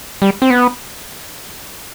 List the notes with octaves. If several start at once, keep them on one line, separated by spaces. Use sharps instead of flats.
G3
C4
B3